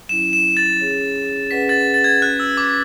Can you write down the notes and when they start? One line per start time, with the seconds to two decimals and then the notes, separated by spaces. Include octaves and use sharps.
0.09 F#3 C#4 E4 E7
0.33 E7
0.57 A6
0.80 C#4 G#4 C#5
1.51 C#4 G#4 B4 D5 F#5 B6
1.69 A6
1.94 A6
2.04 G#6
2.22 C#4 F#4 B4 F#6
2.40 E6
2.57 D6